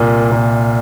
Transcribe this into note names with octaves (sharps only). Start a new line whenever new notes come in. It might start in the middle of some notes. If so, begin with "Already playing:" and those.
Already playing: C2 A#2
A#2